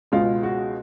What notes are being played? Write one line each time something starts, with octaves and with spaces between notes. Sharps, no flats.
C#2 B2 G#3 F4
F#4